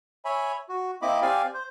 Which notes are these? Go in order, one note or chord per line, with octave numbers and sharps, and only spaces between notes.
C#5 E5 G#5 B5
F#4
A#3 C4 E4 D#5 B5 D6
C4 G4 D5 F5 G#5
C5